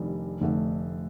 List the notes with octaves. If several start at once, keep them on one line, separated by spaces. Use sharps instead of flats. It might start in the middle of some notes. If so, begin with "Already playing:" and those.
Already playing: F1 F2 D#3 G3 D4
F1 F2 D3 A3